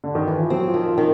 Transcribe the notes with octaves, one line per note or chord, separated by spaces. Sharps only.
D3
D#3
E3
F3
F#3 C4
F3
D#3
F3
D#3